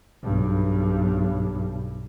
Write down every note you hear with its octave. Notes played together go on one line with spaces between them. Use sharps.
B1 G2